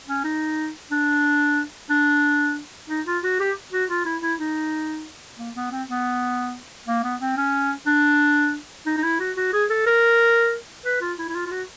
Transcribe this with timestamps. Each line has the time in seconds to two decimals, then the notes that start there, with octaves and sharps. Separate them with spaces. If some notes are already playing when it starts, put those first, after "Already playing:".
0.09 C#4
0.24 D#4
0.92 D4
1.90 D4
2.90 D#4
3.07 F4
3.24 F#4
3.40 G4
3.73 F#4
3.90 F4
4.05 E4
4.22 E4
4.39 D#4
5.39 A#3
5.55 B3
5.72 C4
5.88 B3
6.88 A#3
7.04 B3
7.21 C4
7.37 C#4
7.87 D4
8.87 D#4
8.98 D#4
9.04 E4
9.20 F#4
9.37 F#4
9.53 G#4
9.70 A4
9.86 A#4
10.85 B4
11.01 F4
11.19 E4
11.29 E4
11.35 F4
11.47 F4
11.51 F#4